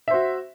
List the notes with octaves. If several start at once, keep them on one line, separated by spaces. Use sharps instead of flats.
F#4 C5 E5